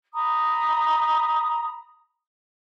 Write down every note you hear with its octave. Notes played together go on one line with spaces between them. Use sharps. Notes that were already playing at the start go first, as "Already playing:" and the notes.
A#5 B5 D#6